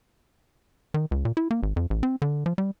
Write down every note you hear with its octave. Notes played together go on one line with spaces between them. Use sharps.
D#3
C#2
A#2
E4
A#3
G#1
F2
A1
C4
D3
F3
G3